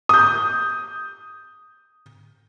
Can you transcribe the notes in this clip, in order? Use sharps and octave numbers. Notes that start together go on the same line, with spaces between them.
D#6 G6